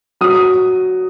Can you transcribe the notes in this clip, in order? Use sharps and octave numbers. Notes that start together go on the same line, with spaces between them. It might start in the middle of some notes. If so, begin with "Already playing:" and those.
F#3 D#6